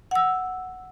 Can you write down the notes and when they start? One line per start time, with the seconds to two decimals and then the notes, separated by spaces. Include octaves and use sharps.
0.11 F#5 E6